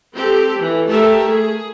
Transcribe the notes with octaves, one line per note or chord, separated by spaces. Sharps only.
C4 G4 A4
E3
A3 G4 A4 A#4 E5
G#4